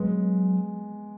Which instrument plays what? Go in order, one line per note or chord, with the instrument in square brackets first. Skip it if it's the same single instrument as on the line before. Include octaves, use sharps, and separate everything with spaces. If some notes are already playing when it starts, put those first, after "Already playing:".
Already playing: [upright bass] F#3 [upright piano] G#3 B3